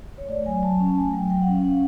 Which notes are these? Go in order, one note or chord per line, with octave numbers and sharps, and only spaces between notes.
C#5
A3 D5
F#3 G#5
F#3 A5
C#4
A5
A3 G#5
F#3 G5
F#3 G5
F#5
C#4
F5
C#4 F#5